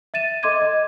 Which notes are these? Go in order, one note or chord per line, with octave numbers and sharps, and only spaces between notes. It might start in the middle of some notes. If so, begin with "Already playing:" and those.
E5 A6 D#7 E7
A4 D#5 C6 D6 G#6 D#7
D#5